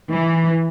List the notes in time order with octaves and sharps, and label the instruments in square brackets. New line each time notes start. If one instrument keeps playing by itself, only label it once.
[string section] E3